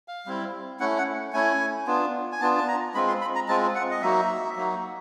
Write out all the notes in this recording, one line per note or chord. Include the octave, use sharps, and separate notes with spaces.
F5
G3 C4 E4
A3 C#4 E4 F#5
F#5
A3 C#4 E4 G#5
B3 D4 F4
G#5
B3 D4 F4 A5
A5
A#5
G#3 C4 F4 B5
C6
B5
A#5
G#3 C4 F4 A5
F#5
D#5
F#3 A#3 D#4 F#4 E5
F#3 A#3 D#4 F#4